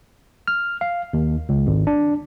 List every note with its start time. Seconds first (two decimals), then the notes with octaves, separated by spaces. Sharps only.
0.48 F6
0.81 F5
1.13 D#2
1.49 C#2
1.67 G#1
1.87 D4